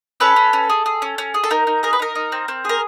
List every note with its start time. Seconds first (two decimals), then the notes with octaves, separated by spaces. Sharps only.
0.20 C#4 A4 B4
0.36 C#4
0.53 C#4
0.69 G#4
0.86 G#4
1.02 C#4
1.18 C#4
1.34 G#4
1.44 A4
1.51 D#4 A#4
1.67 D#4
1.83 G#4 A#4
1.93 B4
1.99 D#4 A#4
2.15 D#4
2.32 C4
2.48 C4
2.65 G#4 A#4